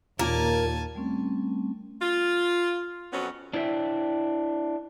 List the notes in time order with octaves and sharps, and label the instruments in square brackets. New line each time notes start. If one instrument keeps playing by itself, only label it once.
[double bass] D#2 [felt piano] A#2 F4 [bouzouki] A#3 A#4 [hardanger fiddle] G#5 A5
[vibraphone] G3 A3 C4 C#4
[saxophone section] F4
F2 F#3 B3 C#4
[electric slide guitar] D4 E4 C5 D5 E5 G5